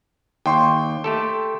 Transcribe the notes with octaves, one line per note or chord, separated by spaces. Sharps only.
D#2 G5 C6 C#6
A3 G4 A4